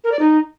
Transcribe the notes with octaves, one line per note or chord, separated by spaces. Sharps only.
A#4
D5
D#4